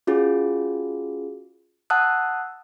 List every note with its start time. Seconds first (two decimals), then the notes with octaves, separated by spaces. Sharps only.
0.07 C#4 F4 F#4 G#4
1.90 F#5 A5 D#6 E6 F#6